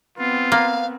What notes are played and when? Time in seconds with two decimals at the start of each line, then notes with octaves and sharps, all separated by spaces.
0.18 B3 C4 F4
0.52 A#3 F5